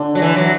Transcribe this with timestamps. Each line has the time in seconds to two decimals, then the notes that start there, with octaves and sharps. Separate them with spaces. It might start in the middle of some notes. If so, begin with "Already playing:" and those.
Already playing: D3
0.15 F#3
0.22 E3
0.36 F#3